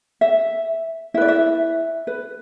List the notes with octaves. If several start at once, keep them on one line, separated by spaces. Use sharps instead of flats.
E5
E4 B4 D5 E5
E5
B4